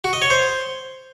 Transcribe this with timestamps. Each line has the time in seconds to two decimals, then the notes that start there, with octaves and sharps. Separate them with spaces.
0.04 F#4
0.13 D#5
0.22 C#5
0.30 C5